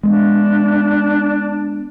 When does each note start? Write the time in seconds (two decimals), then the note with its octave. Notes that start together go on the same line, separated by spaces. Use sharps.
0.03 G#3 A#3 B3 D4